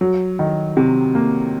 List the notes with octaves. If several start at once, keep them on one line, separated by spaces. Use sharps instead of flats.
F#3
D#3
C3
A#3